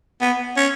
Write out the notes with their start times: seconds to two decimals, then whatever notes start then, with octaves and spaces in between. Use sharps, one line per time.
0.21 B3
0.57 C#4